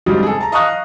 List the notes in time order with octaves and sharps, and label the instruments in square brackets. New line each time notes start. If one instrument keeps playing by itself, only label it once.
[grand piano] F2 G#2 C#3 F#3 G3
G#4 A4
A5 A#5
D#5 F5 A#5 C#6 D#6 F#6